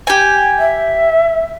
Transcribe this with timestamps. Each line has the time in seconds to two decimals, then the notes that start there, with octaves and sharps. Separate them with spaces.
0.07 G4 G#5
0.59 E5